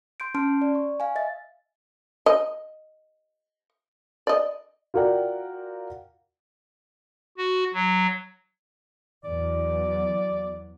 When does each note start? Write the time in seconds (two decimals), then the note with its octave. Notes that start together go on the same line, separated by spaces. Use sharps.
0.20 C6 G6 D7
0.34 C#4 A5 C6 F6 D7
0.61 D5
0.75 C#6
1.00 F5 G#5
1.16 D#5 E5 A6
2.26 D#5
4.27 D5 D#5
4.94 F4 F#4 A#4 D5 F#5 G5
7.38 F#4
7.74 F#3
9.24 E2 F#3 D5